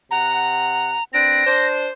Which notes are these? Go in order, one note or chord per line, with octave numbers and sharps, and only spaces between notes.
C3 F#5 A#5
C4 D4 B4 A#6
D4 C5